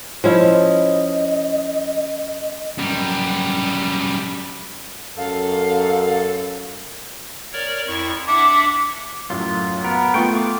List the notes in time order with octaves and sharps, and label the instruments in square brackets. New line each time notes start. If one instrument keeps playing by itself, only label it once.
[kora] F3 C#4 E4 [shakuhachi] D#5
[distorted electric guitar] F#2 G3
[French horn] F#2 [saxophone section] A4 [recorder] F5
[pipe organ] A#4 C#5 D5
F2 E4 C#6
[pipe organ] D4 E5 F#5 [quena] D6
[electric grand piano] F#2 A2 F#3 [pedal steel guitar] F4
[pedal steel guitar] B3 A#4
[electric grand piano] A3 B3 F4 [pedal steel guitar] G5 C#6
[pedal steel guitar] D6